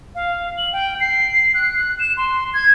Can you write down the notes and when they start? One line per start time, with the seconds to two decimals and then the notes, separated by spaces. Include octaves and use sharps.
0.15 F5
0.58 F#7
0.73 G5
1.01 C7
1.54 F#6
1.99 E7
2.17 C6
2.54 G#6